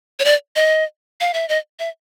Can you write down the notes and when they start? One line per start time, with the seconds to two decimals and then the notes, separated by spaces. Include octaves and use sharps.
0.19 C#5
0.25 D5
0.56 D#5
1.21 F5
1.34 E5
1.49 D#5
1.79 E5